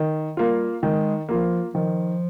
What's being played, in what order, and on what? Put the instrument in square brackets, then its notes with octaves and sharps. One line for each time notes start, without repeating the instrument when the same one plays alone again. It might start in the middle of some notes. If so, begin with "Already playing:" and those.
Already playing: [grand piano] D#3
[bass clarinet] G3 [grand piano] A#3 F4
[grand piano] D#3 [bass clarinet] G#3
[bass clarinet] F3 [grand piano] A#3 F4
[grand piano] D#3 [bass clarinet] F3